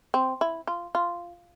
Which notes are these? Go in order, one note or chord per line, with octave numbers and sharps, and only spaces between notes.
C4
E4
F4
F4